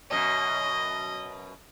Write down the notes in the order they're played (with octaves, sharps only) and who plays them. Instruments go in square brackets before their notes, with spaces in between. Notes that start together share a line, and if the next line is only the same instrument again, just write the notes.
[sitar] F#2 B2 [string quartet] D#5